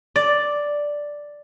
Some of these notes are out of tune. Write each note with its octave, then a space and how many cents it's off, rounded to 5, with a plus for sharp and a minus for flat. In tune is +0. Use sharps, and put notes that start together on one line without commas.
D5 +0